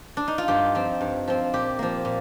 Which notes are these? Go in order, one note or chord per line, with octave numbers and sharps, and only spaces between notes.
D4
D#4
F4
G2 G4
F3 C4
G2
F3 C4
A#2 G4
F3 A#3
A#2